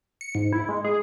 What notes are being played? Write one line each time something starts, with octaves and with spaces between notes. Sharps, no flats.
C#7
G#2
E4
G#3
G#4